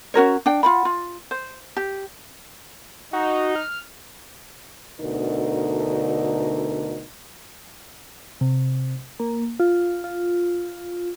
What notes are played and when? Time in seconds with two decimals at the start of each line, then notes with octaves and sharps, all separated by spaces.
0.14 C#4 F#4 A#4 C#5
0.46 D4 G5
0.63 F4 F#5 B5
0.85 F4
1.31 C5
1.77 G4
3.13 D#4 F#4
3.56 F6
5.01 D2 B2 D3 D#4 A#4
8.41 C3
9.20 A#3
9.60 F4
10.04 F4